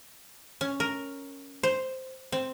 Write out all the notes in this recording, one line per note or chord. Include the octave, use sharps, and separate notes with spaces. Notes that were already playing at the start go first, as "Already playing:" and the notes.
C#4
A#4
C5
C4